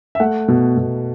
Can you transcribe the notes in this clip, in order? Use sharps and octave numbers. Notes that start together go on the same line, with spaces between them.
E5
A3 F#5
B2
B2